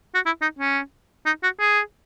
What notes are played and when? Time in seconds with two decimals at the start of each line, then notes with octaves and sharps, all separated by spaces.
0.15 F#4
0.26 E4
0.42 D#4
0.59 C#4
1.26 D#4
1.43 F#4
1.60 G#4